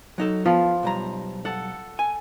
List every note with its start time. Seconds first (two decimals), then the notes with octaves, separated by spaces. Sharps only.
0.18 F#3 D#4 A4
0.46 F3 B3 F4
0.83 B1 G3 A#5
1.45 A4 F#5
1.99 G#5